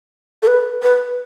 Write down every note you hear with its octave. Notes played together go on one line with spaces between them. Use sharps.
A4
B4
B4